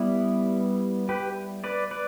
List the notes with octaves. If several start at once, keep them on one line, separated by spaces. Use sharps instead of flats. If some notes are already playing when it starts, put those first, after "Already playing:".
Already playing: G3 B3 E4 B4 D5
G4 B4
B4 D5
B4 D5